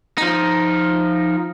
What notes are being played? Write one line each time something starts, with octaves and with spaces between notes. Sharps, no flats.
F3 D#4